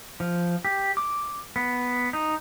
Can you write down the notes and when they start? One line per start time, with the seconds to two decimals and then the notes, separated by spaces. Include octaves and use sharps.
0.20 F3
0.65 G4
0.97 D6
1.56 B3
2.13 D#4